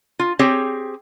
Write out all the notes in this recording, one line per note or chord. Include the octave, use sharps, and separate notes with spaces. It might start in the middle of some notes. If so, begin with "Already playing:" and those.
F4
C4 G4 G#4 C#5